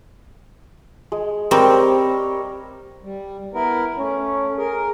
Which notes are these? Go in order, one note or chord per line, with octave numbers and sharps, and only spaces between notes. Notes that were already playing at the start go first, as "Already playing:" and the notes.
G#3
G3 C4 A#4 C#5
G3
B3 E4 A#4
A3 C#4
G#4 A#4